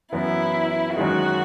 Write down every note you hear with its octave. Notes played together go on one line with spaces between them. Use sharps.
F#2 E3 B3 E4
F#2 D#3 G#3 F#4